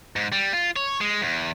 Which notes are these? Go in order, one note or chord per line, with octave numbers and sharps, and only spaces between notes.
G#2
G3
F4
C#5
G#3
E2